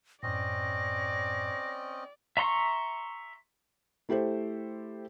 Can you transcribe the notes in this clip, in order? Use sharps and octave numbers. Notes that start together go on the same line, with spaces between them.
F#2 A2 C4 C#4 D5 D#5 A#6
E5 A#5 C6 C#6
A3 E4 G4 A4 C5